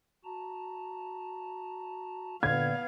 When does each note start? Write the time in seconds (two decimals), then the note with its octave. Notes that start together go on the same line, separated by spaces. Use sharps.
0.24 F#4 A5 A#5
2.43 A#2 D3 A#3 B3 D5 F5 G#6